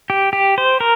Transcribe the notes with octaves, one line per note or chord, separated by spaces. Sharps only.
G4
G4
C5
A#4